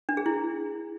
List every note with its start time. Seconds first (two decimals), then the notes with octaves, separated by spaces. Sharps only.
0.09 D4
0.17 G#4
0.26 E4